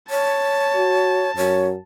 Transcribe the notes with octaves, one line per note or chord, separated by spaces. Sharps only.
C#5 A5
F#4
F#2 C#5